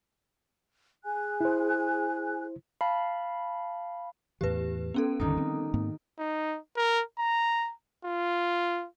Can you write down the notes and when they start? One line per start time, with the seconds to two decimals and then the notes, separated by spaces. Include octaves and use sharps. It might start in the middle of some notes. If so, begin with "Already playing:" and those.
1.05 G#4 G#5 F#6
1.41 E4 C5
2.81 F5 A5 B5
4.41 E2 A2 E3 G4 B4
4.94 B3 C#4 A4
5.20 G#1 E2 D3 D#3 G3 D#4
5.38 C4
5.74 G#2 A#3 C4
6.19 D#4
6.77 A#4
7.18 A#5
8.05 F4